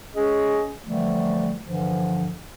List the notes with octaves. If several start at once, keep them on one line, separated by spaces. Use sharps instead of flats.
C#4 G#4 D#5
D3 E3 F3 G3 A3
G2 D3 E3 F3